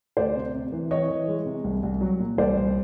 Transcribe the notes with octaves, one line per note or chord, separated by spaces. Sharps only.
D2 C5 D5
C3
C3
E3
E3 C#5 D#5
E3
G#3
C3
C2
C2
F#3
A#2
C2 C5 D5
C2